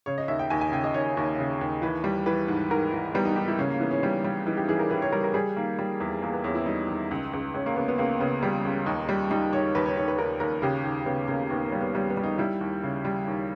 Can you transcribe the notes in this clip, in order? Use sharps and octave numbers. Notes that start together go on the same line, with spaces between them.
C#3 C#5
D#5
D#2 E5
G5
D#2 G#5
G#5
C#3 G5
D#5
D#2 C#5
D#2
C#3
D#2
E3 B4
G3
E3 B4
G#2
G#2 A#4
E3
G3 B3
D#4
G#2 G4
E4
C#3 C#4
A#3
E3 B3
C#4
G3
G3
E3 D#4
G4
E3 G#4
A#4
E3 B4
C#5
G3 A#4
A#4
G3 G#4
D#3 A#3
G3
E2
E2 A#3
B3
E2 C#4
E4
G3 D#4
D#3
C#2
C#2
C#2 C#4
A#3
C#2 B3
B3
C#2 A#3
C#3 B3
G3
C#2
D#2 D#4
G3
G3 D#4
D#3 C#5
D#2 B4
C#5
D#2 C#5
B4
D#2 A#4
D#2 A#4
C#3 G4
D#2
C#3 B3
C#3 A#3
D#2 B3
A#3
G3
B3
G3 B3
B3
G3
D#4
G3 E4
D#2
C#3
G3
D#2